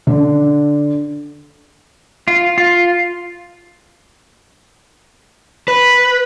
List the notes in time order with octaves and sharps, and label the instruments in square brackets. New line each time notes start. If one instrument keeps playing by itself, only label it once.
[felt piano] D3
[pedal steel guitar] F4
F4
[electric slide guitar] B4